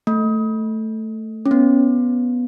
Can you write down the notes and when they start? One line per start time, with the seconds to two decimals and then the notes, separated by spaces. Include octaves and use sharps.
0.07 A3
1.46 C#4
1.51 B3